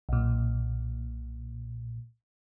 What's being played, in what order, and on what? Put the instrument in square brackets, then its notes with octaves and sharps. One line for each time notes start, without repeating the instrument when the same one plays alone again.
[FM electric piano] B1 A#2